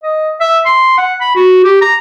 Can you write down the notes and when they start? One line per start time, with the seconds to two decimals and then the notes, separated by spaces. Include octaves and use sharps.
0.03 D#5
0.40 E5
0.66 C6
0.98 F#5
1.21 B5
1.35 F#4
1.64 G4
1.81 A#5